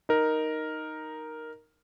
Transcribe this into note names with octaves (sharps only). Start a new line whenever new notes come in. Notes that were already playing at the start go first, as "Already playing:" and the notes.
D#4 A#4